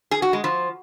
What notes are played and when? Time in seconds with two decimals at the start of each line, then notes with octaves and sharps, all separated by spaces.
0.11 G#4
0.22 F#4
0.33 G#3
0.44 F3